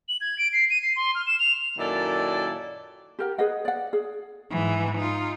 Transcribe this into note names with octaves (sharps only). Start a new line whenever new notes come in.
F#7
G#6
D7
C7
D#7
C7
C6
F6
E7
F7
F#2 A#2 D#3 E4 A4 D5
G4 A#4 F#5
G#4 B4 D#5 F#5
D5 F#5
G#4
G#2 E3
D#4 F4